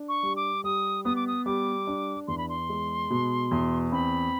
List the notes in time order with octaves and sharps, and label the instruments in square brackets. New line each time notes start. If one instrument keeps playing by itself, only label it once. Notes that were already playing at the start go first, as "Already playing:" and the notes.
Already playing: [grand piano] D4
[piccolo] C#6
[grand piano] G3
[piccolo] D6
[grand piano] G3 [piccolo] D#6
[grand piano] B3 [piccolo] D#6
[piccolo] D6
D#6
[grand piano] G3 [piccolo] D6
[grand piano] D4
[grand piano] E2 [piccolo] C6
[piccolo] B5
C6
[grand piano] G#3
B2
E2
[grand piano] C4 [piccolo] B5